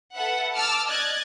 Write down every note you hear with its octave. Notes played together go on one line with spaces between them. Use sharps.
A4 B4 E5 F#5
A5 D6 E6 F6
D5 D#5 F#6 G#6 A6